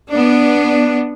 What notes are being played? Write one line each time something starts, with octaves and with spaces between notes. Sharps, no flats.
B3 D4